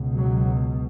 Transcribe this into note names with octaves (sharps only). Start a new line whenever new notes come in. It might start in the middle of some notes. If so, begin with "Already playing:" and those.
Already playing: C#2 B2
F#3